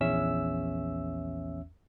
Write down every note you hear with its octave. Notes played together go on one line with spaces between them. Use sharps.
A#1 E2 C#4 E5 E6